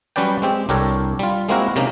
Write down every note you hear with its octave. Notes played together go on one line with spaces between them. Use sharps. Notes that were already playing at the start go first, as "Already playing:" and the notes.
F#3 G3 C#4 B4 D5 G5
G#3 C4 G4
C2 D4 G4 A4 A#4 C#5
G3 F4
G#3 A#3 C4 E4 F#4 A#4
C3 A#3 C#4 D#4